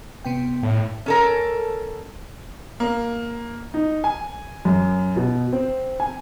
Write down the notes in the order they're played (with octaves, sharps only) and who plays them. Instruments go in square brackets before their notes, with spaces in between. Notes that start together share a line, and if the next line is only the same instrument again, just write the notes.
[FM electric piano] C3 B3 G5
[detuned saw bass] A2
[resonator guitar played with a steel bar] C#4 A4 A#4
[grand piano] A#3
[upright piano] D#4
G#5
F#2
B2
C4
G#5